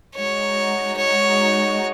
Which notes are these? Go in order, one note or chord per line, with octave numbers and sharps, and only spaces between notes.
G#3 D#4 F#4 C#5
C#5